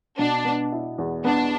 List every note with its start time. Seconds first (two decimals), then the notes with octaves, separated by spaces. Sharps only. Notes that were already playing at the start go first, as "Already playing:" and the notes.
0.18 B2 D4
0.45 B3
0.72 E4
0.98 E2
1.25 B3 D4